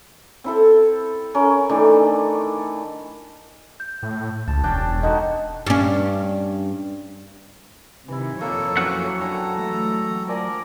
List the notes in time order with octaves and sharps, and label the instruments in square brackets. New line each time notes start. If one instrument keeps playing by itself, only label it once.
[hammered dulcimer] C4 E4 A4
C#4 A#4
D#3 E3 A3 D4
[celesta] G6
[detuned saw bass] A2
[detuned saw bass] C#2 [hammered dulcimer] A5
[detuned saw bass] E1 [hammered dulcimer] C#4 D4 G5
[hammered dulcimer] D3 D#4 F#4 [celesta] D#5
[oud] G2 C#4
[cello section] C3 D#3 [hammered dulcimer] E3 E4
[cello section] F2 C#5 [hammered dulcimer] A#2 [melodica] A#3 A4
[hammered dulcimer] E3 [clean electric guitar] F#3 C#4 F#5
[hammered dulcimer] D3 G3 G#5 [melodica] A4 A#5
[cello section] E3 G#3 A3
[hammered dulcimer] F3 D5 G#5 [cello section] A#4